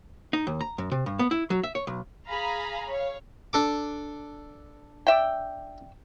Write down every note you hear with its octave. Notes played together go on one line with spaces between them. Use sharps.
D#4
D#2
A#5
F#2
C3
G2
B3
E4
F#3
E5
C#5
B1
G#4 F5 A#5 B5
C#5 F5
D4 A4 D6
D5 E5 G5